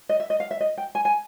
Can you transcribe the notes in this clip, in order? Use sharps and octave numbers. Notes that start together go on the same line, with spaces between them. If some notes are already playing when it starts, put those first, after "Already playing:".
D#5
E5
D#5
F5
E5
D#5
G5
G#5
G#5